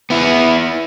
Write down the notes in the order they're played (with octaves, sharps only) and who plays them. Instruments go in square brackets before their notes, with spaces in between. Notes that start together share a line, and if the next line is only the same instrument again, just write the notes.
[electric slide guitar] B3 E4